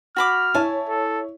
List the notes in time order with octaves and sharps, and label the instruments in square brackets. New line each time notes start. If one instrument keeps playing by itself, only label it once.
[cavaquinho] F#4 B5 D6 [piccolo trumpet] F6
[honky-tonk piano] E4 C#5 [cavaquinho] G#5 A5
[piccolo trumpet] A4